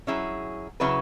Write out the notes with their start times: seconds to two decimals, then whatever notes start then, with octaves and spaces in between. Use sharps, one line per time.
0.07 F#3 C#4 E4 G#4
0.80 C#3 F#3 C#4 E4 B4